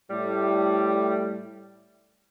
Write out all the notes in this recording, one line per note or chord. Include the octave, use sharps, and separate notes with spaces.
A2 G3